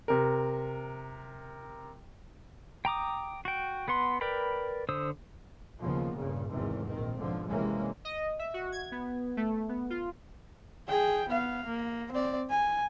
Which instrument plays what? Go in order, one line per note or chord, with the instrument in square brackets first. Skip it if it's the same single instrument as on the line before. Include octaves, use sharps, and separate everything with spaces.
[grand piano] C3 A#4
[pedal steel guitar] G5 A#5 D6 D#6
F#4 G5
B3 B4 F#5 C6
A#4 B4 D5 G5 B5
D3 C5 D#6 E6
[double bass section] D#2 C#3 F3 A#3 B3
G2 A#2 C#3
G#1 E2 G#2 C3 D#3 E3
A#1 D#3 C4
B1 G#2 D3 F3
C3 E3 G#3 A#3 C#4
[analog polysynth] D#5
E5
F#4
G#6
B3
A3
B3
F4
[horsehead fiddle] G#4 G5
B3 F5
A#3
C4 D5
G#5